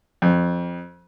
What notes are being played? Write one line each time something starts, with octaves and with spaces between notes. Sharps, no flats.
F2